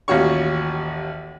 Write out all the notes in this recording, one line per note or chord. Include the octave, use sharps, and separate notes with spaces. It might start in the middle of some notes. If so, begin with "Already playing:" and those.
A1 D#2 F4 F#4 C#5 C#6